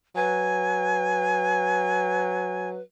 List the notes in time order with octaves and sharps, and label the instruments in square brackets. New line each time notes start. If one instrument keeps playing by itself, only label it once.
[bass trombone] F#3 [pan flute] B4 [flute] G#5